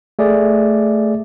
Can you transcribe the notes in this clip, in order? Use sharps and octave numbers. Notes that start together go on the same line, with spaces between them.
A3 G#4 D5